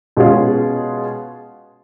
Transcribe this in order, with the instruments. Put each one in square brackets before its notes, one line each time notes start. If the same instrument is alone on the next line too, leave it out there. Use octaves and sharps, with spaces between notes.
[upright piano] B2 G#3 C#4 F4 G#4